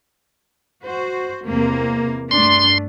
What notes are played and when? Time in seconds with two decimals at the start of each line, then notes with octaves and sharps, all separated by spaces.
0.84 F#4 C5
1.46 E2 C3 A#3
2.31 G2 A3 D4 C6